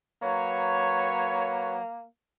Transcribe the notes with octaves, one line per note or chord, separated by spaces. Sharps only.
F#3 A#3 B4 C#5